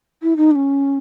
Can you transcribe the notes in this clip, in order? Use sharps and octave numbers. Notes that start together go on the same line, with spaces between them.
E4
D#4
D4
C#4